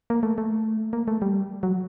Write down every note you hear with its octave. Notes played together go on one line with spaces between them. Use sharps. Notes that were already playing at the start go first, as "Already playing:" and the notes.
A#3
A3
A3
A#3
A3
G3
F#3